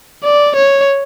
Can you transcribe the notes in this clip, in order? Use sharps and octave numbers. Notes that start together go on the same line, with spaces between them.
D5
C#5